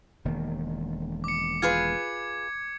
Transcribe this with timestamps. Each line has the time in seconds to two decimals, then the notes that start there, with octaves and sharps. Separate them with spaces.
0.25 E1 D#3 A#3
1.24 D6 C#7
1.62 F4 G#4 B4 G#6 C#7